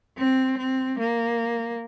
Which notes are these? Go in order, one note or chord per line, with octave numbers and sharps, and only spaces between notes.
C4
C4
A#3